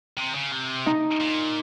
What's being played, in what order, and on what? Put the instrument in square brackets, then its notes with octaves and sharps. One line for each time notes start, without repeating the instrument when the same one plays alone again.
[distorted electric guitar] C3
C#3
C3
[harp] D#4
[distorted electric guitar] A#2